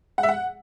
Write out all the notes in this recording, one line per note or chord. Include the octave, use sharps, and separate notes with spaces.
F#5
E5
F#5